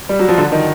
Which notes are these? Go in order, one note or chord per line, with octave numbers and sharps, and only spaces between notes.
G3
F#3
F3
D3
D#3